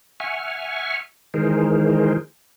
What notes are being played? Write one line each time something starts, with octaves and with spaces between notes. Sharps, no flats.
E5 F#5 G#5 C#6 F6
D#3 E3 G#3 G#4 A#4 C5